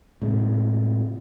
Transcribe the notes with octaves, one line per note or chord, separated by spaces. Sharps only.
A2 C3 G#3